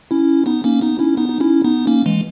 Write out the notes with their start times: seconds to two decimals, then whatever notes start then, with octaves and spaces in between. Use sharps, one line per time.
0.11 C#4 E4
0.46 B3 D#4
0.64 A#3 C#4
0.81 B3 D#4
0.99 C#4 E4
1.17 B3 D#4
1.29 D#4
1.40 C#4 E4
1.64 B3 D#4
1.87 A#3 C#4
2.06 E3 G#3